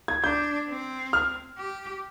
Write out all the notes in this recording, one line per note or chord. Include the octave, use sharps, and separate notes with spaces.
G#6
D4 G6
C4
F6
G4